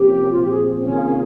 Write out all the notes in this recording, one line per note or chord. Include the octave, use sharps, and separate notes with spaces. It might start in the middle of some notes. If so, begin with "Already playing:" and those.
Already playing: C3 F3 A#3 C#4 G4
A#2 F3 C4 F4
G4
G#4
C#4
C3 D#3 A#3 F4 G#4